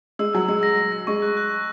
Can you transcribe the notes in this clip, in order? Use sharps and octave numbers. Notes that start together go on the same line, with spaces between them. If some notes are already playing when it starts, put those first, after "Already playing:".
G#3 E6
F#3 E6
G#3 E6
A#6
A#6
A#6
G#3 C#6
F#6
F#6
F#6